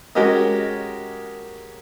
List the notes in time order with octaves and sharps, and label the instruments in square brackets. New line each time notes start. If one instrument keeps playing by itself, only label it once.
[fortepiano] G#3 C#4 F#4 G4 A#4 D#5